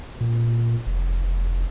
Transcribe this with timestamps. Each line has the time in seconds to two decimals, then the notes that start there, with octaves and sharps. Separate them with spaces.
0.21 A#2
0.86 F1